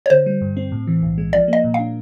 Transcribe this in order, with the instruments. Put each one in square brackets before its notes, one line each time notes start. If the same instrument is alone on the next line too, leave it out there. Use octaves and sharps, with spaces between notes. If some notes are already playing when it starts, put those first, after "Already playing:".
[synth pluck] C#5
[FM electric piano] D3 [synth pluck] C5
[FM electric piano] G3
G2
C4
A2
E3
B1
G#3
[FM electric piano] F3 [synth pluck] D5
[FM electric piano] A#3 [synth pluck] D#5
[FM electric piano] A#2
[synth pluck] F5
[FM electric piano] D4